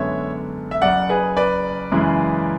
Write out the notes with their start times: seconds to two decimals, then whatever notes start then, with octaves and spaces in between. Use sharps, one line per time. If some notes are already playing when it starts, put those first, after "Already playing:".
Already playing: F#2 D3 G#3 B3 D4 C#5 E5
0.71 E5
0.82 F#1 F#2 C#3 D5 F#5
1.09 G#4 B4
1.37 B4 D5
1.92 F#2 C#3 E3 G#3